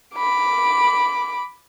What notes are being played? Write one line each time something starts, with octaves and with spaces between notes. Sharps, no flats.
B5 D6